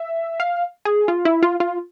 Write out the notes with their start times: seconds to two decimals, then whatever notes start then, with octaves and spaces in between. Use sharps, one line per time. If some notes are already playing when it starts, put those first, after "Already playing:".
Already playing: E5
0.40 F5
0.85 G#4
1.08 F4
1.25 E4
1.43 F4
1.60 F4